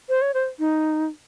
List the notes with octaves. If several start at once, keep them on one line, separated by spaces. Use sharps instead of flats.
C5
C#5
C5
D#4